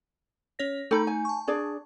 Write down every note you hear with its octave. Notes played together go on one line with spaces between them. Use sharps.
C#4 C#5 A#6
A3 D#4 A4 G5 A#5 B5
G#5
A5 C#6
D4 G#4 D5